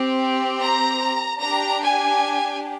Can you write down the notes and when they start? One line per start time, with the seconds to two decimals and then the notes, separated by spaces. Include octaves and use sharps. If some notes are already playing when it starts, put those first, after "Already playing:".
Already playing: C4 G4
0.60 A#5
1.41 D4 G4 A#5
1.82 G#5